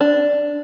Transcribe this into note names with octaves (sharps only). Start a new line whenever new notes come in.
D4